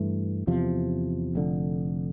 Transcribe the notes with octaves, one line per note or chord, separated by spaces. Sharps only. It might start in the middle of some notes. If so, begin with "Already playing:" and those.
Already playing: G2 E3 A3
E2 C3 F3
F1 F2 D3